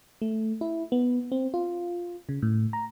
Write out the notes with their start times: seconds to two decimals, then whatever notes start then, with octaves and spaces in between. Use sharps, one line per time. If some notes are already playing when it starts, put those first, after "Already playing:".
0.22 A3
0.61 E4
0.92 B3
1.32 C4
1.54 F4
2.29 C#3
2.42 A2
2.73 A#5